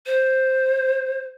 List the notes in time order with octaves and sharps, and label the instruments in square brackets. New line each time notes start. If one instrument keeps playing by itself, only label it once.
[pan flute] C5